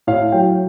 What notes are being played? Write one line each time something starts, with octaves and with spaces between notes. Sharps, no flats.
A2 F5
F#3 G5